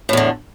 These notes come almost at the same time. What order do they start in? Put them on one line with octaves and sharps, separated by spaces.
A2 E2 D3